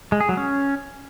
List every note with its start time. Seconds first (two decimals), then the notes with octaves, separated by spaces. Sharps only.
0.12 G#3
0.21 G#4
0.29 F#3
0.37 C#4